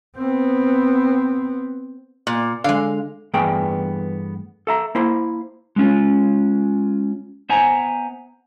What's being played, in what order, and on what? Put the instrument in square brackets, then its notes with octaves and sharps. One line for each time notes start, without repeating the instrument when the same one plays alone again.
[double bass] B3 C4
[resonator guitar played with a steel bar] A#2
[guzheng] D3 G#3 [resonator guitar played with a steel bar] F5
[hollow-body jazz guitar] G2 E3 A3 B3 G#4 G5
A4 E5 A#5
A#3 E4 C5
[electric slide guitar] G#3 C#4 F4
B3 C5 E5 F#5 G#5 A#5